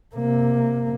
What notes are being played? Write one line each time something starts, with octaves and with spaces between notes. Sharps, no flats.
C3 A#3